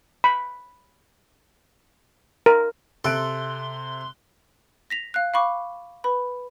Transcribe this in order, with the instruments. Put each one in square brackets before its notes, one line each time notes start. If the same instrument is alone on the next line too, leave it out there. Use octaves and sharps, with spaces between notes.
[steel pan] B5
A#4
[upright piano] C3 [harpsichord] A4 [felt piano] E5 F#6 D7 [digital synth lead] C6
[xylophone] A#6 B6 F7
F5 F#6
F5 B5 C#6 D6
B4 B5